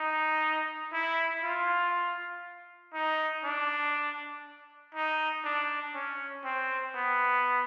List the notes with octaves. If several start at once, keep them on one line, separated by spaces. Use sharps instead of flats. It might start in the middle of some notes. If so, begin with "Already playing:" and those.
Already playing: D#4
E4
F4
D#4
D4
D#4
D4
C#4
C4
B3